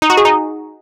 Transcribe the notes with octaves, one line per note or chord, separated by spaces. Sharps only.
D#4
F#4
G#4
D#4